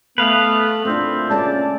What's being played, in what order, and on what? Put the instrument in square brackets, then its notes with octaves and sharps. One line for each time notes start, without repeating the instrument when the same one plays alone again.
[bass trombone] A3 [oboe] B3 [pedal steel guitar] B4 F5
[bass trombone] A#2 [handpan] A3 D4 [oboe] C4
[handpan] G#3 C#4 D5 [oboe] A5